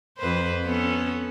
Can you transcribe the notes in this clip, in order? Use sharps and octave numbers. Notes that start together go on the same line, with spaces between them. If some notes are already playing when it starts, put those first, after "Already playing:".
F2 B4 C5
B3 C#4 A4